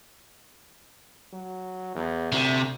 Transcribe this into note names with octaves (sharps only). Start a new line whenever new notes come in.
F#3
E2
D2 C3